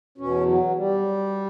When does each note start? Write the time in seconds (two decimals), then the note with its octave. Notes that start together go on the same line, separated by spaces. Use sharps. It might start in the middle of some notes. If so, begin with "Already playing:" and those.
0.18 E2 B2 C#4
0.46 F#3
0.76 G3